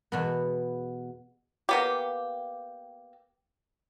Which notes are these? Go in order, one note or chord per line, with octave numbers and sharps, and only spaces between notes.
E2 B2 B3
A#3 B3 G4